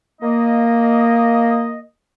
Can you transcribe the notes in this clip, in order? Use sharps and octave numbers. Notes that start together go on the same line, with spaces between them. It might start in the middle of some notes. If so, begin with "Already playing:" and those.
A#3 D#5